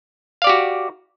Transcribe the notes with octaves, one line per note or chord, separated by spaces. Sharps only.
F#4 G4 D5 F5